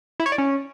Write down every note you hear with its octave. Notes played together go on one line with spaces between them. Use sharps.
E4
C#5
D5
C#4